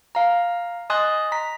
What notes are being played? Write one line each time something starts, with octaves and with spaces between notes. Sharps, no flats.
F5 A#5
D#5 G#5 C6 D#6 F#6 A6
A#5 B6